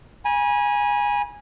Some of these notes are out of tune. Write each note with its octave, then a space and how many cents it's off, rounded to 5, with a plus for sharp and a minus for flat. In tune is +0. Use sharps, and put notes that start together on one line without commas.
G#5 -10 B5 -45